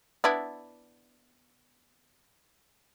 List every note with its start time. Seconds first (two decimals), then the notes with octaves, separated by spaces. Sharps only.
0.24 B3 D4 E4